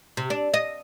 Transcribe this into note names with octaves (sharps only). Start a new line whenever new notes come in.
C3
D4
D#5